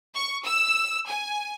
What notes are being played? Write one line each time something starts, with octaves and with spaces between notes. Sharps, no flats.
C#6
E6
G#5